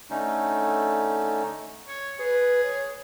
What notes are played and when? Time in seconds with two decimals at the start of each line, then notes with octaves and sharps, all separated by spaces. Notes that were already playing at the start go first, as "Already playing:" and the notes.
0.10 D3 A3 C#4 D#4
1.88 C#5
2.20 G#4 B4
2.64 C#5